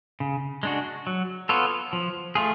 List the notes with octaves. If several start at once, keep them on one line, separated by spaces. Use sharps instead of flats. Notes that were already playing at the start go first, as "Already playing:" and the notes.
C#3
G#3 D4 F#4
F#3
B3 F4 A4 C#5
F3
A3 F4 G#4